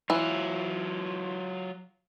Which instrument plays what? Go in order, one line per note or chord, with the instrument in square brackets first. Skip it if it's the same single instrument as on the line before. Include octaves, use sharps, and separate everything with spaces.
[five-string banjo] E3 [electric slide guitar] F#3 F4